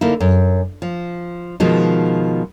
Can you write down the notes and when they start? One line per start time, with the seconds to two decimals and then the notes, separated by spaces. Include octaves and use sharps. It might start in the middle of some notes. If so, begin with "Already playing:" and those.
0.01 D3 A#3 D#4 E4
0.20 F#2
0.82 F3
1.60 B2 D#3 F3 G#3 D#4